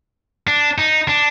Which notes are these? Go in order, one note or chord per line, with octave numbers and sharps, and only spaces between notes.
D4
D#4
D4